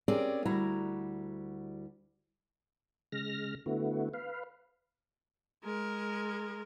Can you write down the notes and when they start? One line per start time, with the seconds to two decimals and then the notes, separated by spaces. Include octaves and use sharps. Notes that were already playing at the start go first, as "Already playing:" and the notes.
0.08 C4 C#4 G4 G#4 A#4 D5
0.45 D2 G3 E4 F#4 A#5
3.12 C#3 G#3 F6 A#6
3.66 D3 A3 B3 E4 F#4
4.14 B4 F5
5.63 G#3 A#4